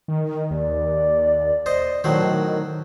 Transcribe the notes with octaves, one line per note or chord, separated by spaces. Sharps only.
D#3
D#2 D5
C5 D#5
A2 D#3 F#3 C5